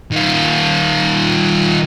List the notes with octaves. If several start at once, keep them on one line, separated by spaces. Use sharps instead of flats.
D#3 F4